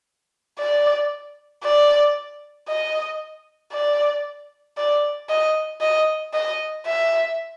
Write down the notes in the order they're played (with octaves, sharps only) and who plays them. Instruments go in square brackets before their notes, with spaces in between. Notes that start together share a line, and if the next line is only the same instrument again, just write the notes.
[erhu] D5
D5
D#5
D5
D5
D#5
D#5
D#5
E5